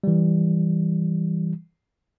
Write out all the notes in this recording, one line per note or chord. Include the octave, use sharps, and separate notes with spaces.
E3 G3